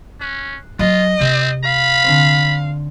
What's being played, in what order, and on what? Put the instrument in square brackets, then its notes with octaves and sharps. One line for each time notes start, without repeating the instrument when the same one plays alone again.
[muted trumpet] C#4 [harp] F#6 C7
[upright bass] F#3 [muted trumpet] F4 [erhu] D#5
[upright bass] C3 [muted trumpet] C4
[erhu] F5 [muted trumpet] B5
[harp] D3 C4